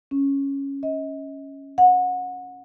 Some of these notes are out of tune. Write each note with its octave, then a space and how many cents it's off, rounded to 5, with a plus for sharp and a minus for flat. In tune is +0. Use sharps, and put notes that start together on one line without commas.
C#4 -5
D#5 +35
F#5 -25